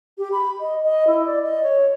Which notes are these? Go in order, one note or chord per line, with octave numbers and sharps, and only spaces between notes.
G4
B5
D#5
D#5
E4
D5
D#5
C#5